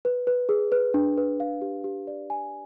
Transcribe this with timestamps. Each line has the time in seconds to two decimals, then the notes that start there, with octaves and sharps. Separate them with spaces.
0.05 B4
0.27 B4
0.49 G#4
0.72 B4
0.94 D4
1.18 B4
1.40 F5
1.61 G4
1.84 G4
2.07 D5
2.30 G#5